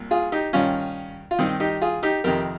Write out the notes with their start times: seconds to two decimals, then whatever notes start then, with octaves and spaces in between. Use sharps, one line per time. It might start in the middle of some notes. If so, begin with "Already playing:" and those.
Already playing: C2 A#2
0.11 F4 G#4
0.32 D#4 G4
0.53 G2 D#3 C#4 F4
1.31 F4
1.39 G2 D#3 C4 D#4
1.60 D#4 G4
1.82 F4 G#4
2.03 D#4 G4
2.24 F2 C3 D#3 G4 A#4